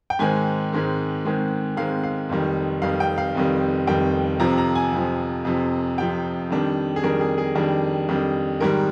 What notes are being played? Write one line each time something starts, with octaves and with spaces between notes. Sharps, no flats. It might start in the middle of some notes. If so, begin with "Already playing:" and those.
G5
G#2 D#3 G#3 C4 G#5
G#2 D#3 G#3 C4
G#2 D#3 G#3 C4
G#2 D#3 G#3 C4 F5
F5
F1 F2 D#3 G3
F1 F2 D#3 G3 F5
G5
F5
F1 F2 D#3 G3
F1 F2 D#3 G3 G5
F2 C3 F3 A#5
A#5
G#5
F2 C3 F3
F2 C3 F3
F2 C3 F3 G5
F2 D#3 G3 D4
G#4
F2 D#3 G3 D4 A#4
G#4
G#4
F2 D#3 G3 D4
F2 D#3 G3 D4
G#2 D#3 G3 A#4